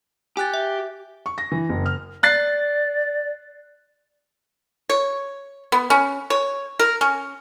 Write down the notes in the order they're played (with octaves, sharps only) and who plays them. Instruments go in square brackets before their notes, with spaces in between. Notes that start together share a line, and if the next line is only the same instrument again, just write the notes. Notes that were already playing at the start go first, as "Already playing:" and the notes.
[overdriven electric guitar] G4 [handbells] G#5 F#6 A6
[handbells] E5
[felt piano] C#6
A#6
E3
F#1
F6
[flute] D5 [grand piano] F#6 A6 C7
[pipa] C#5
B3
C#4
C#5
A#4
C#4